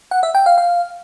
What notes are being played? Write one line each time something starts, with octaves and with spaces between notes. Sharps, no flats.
F#5
E5
G5
F5
F5